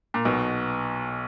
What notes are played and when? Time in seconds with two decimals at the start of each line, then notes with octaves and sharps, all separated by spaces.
0.14 A#2
0.25 B1 B2